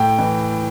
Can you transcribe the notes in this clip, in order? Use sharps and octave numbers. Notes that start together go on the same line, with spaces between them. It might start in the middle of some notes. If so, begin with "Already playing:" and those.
Already playing: A2 G5
E3